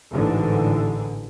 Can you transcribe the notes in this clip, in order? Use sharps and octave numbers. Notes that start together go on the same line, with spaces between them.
A1 G#2 D3 E3